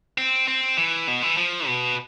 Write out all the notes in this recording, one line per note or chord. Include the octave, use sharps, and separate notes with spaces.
C4
C4
E3
B2
E3
F3
B2